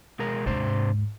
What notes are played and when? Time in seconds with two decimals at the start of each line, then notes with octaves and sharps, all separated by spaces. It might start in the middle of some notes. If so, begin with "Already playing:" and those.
0.19 B2 G#3 A#4
0.46 D#2 G#2 C3 D4 C5